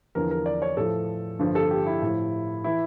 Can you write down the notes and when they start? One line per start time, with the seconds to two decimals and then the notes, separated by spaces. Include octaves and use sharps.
0.15 E2 D3 F3 A#4
0.31 A#4
0.46 D5
0.62 C#5
0.77 A2 F3 A4
1.39 G2 D3 F3
1.55 A4
1.71 G4
1.86 E4
2.02 A2 F3
2.64 E3 E4